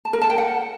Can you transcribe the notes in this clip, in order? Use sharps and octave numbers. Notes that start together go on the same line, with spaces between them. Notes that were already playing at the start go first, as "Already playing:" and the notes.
A5
A#4
A5
G5
F#5